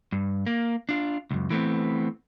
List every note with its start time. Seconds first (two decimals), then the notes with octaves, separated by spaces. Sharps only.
0.12 G2
0.47 A#3
0.89 D4 F4
1.31 C#2 F#2
1.50 E3 A3 B3 C4